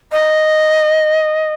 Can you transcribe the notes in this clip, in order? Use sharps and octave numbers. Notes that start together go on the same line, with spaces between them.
D#5